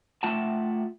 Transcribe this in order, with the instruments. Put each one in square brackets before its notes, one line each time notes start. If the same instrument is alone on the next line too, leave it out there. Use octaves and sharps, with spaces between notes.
[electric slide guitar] A3 F4 E5 F#5 G5 A5